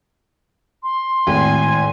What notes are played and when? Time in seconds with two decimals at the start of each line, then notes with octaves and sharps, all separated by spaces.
0.83 C6
1.27 G#1 A2 G#5